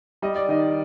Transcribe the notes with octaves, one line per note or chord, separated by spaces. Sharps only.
G3 D#5
D5
D#3 D#5